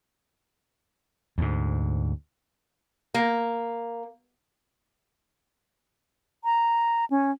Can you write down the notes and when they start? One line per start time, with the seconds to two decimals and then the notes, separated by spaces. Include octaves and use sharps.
1.38 D2 G#2
3.14 A#3
6.44 A#5
7.10 C#4